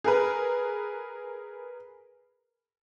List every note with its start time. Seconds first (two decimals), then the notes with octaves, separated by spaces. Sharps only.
0.04 G#4 A#4 B4